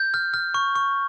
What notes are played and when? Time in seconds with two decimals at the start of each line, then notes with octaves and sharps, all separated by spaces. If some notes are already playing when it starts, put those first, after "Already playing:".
Already playing: G6
0.14 F6
0.34 F6
0.54 C#6
0.75 C#6